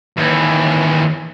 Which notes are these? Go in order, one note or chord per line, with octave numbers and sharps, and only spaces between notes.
D#2 E3